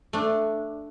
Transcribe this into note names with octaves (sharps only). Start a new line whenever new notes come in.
A3 D4